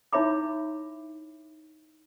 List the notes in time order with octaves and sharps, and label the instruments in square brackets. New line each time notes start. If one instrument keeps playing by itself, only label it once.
[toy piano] D#4 E4 C#5 E5 B5 D6